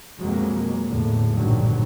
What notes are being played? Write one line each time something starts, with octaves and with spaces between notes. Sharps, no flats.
F2 B2 F#3 G#3 A#3
E2 A2 D3
A#1 G2 D3 D#3 F#3